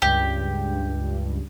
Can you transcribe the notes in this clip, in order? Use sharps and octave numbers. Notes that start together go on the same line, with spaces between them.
C#2 G2 G4